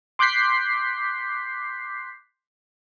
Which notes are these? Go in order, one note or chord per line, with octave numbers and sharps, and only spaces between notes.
C6 D6 F#6 G6 B6 C7